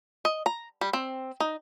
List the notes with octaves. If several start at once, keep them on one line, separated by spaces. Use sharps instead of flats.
D#5
A#5
G3
C4
D#4